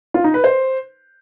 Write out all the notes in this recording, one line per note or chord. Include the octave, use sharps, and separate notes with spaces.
F4
D#4
B4
C5